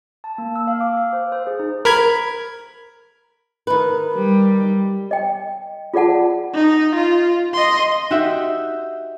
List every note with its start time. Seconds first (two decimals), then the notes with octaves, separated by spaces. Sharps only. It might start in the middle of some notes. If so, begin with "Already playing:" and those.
0.24 A5
0.38 A#3
0.56 E6
0.67 F5
0.81 D6
0.97 F5
1.13 C5
1.32 C5
1.47 G#4
1.59 D#4
1.85 A#4 B5 G#6
3.67 D#3 B4
4.13 G3
5.11 D#5 G5
5.94 F4 G#4 D5 F#5 A5
6.54 D#4
6.96 F4
7.54 D#5 C6
8.11 D#4 F#4 G4 E5